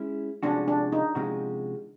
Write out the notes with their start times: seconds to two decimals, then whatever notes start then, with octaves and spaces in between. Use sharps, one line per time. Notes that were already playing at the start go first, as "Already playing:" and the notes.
Already playing: G#3 C#4 E4
0.43 C3 F3 G#3 C#4 D4 F#4
0.68 D4
0.92 D#4
1.15 C3 F3 G#3 C#4 F#4